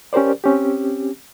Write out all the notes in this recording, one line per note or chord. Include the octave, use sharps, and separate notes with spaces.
C#4 G4 A#4 C5 D5
C4 C#4 G4